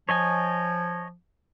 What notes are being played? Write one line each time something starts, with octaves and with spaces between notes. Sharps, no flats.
F3 C#5 D#5 G#5